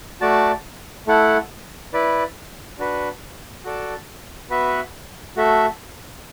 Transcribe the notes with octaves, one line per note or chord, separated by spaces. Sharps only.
A3 F#4 D5 A5
A3 E4 A4 F#5
E4 B4 D5
D4 F#4 B4
F#4 A4 D5 A5
B3 F#4 B4 E5
A3 F#4 A4 E5